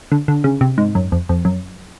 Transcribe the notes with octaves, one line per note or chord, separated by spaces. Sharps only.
D3
D3
C#3
C3
G#2
F#2
F2
F2
F#2